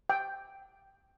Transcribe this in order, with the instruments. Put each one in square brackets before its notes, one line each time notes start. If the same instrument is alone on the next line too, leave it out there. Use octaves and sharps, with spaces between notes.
[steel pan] G5